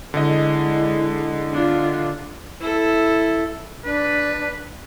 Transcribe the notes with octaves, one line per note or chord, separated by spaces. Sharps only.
D3 G#3 E4 D#5
D4 F4
E4 A4
D4 B4